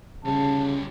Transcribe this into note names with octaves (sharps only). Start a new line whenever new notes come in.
D2 C#3 G3 A5